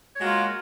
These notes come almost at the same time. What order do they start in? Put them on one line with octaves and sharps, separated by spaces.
C#5 F#4 G#3 A#3 F4